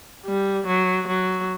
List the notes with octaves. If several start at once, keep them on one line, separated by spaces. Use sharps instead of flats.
G3
F#3
F#3